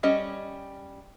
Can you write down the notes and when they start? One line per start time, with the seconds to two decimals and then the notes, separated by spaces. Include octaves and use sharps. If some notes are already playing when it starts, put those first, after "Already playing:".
0.03 G3 C#4 D#5